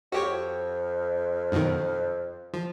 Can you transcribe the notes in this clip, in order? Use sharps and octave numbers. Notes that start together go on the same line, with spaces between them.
F2 F#4 G4 C#5
F#2 B2 D#3
F3